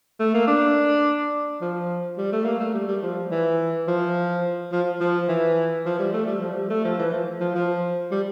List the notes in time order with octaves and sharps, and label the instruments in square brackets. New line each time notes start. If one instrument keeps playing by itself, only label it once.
[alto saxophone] A3
A#3
D4
F3
G3
A3
A#3
A3
G3
G3
F3
E3
F3
F3
F3
E3
F3
G3
A3
G3
F3
G3
A3
F3
E3
F3
F3
F3
G3